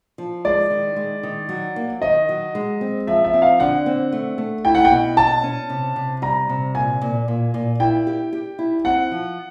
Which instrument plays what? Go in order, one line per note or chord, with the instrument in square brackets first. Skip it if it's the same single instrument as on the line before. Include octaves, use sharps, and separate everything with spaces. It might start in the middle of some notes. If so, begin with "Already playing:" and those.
[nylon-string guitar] F3
[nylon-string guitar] G#3 [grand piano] D5
[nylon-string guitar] D#3
G#3
D#3
F#3
A#3
[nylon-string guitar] D#3 [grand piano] D#5
[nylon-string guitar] F#3
G#3
C4
[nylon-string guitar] F3 [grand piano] E5
[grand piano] E5
[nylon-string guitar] C4
[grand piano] F5
[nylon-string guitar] D3 [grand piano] F#5
[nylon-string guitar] C4
A3
A3
[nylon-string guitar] E4 [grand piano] G5
[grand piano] F#5
G5
[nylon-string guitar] B2
[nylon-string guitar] C#4 [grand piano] A5
[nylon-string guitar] C#4
C3
C3
[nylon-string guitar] G3 [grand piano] A#5
[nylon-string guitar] C3
[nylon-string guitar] A#2 [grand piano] G#5
[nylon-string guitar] A#2
A#2
A#2
[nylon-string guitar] E4 [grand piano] G5
[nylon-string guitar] G4
G4
E4
[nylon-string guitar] C4 [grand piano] F#5
[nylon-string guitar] F3